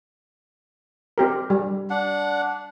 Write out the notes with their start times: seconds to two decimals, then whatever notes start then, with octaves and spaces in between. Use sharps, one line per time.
1.18 C4 G4 A#4
1.50 G3
1.90 D4 F#5